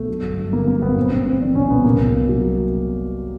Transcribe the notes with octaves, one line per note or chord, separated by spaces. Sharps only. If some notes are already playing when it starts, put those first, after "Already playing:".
Already playing: B1 A3
F#3
G1
G2
D3 A#3
F#3 A#3
G1 B3
B1 C4
B1 C4
A2 C4
E3 D4
B1 C#4
B1 B3
C2 A#3
C2
B2
F#3